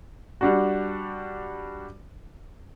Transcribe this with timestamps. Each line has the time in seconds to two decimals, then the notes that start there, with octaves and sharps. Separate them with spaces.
0.41 G3 D4 F#4